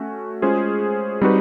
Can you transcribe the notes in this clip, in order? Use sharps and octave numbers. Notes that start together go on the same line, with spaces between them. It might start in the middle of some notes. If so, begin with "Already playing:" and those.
Already playing: A3 C#4 F#4
G#3 C#4 F4 G#4 C5
G3 C4 D#4 F#4 B4